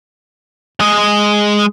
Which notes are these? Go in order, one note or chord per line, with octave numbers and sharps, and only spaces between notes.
G#3 D#5